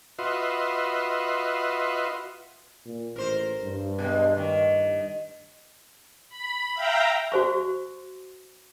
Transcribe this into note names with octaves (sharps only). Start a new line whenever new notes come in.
F4 F#4 B4 D#5 E5 C6
A#2
A1 A#4 C5
G2
B2 G#3
A2 D#3
B5
E5 F5 G5 A#5
F#4 C5 C#6